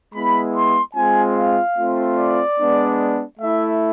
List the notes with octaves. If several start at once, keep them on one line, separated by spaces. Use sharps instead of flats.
G#3 B3 E4 B5
C6
G#3 C4 F4 G#5
F5
A3 C4 F4
D5
G#3 B3 D4
A3 E4 E5